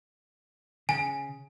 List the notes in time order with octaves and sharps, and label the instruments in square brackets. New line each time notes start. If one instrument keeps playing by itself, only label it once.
[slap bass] C#3 [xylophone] G#5